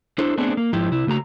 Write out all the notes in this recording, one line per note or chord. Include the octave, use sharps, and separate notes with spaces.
D4 E4 A4 C5
A3 B3 C4 D4 G#4 A4
A#3
G#2 F3 E4 G4
C3 E4
C#3 A3 F#4 A#5